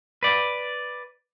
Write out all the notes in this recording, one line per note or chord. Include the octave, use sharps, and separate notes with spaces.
B4 D5